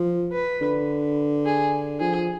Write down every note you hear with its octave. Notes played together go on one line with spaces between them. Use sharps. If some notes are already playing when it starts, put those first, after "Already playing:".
Already playing: F3
B4
D3
G#4
F3 G#4